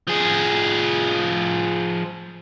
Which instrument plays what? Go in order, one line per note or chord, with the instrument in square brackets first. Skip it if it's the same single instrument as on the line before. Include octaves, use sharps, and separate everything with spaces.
[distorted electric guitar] F3 G#4